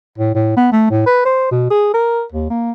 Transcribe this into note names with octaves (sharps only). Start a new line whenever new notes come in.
A2
A2
B3
A3
A2
B4
C5
B2
G#4
A#4
D#2
A#3